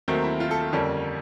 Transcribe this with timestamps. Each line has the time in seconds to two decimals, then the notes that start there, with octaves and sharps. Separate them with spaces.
0.08 D#2 D#3 F#3 A3 C4
0.24 E4
0.40 F4
0.51 A4
0.62 A4
0.72 F2 D3 G3 A#3 C#4